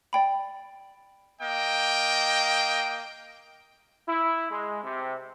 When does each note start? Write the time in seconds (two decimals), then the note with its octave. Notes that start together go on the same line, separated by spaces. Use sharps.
0.13 D5 G5 B5
1.42 A#3 D#5 G5
4.08 E4
4.50 G#3
4.84 C3